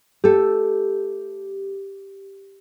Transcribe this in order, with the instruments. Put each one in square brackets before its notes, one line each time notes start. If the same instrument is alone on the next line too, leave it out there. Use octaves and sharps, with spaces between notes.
[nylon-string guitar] A3 A4 [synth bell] G4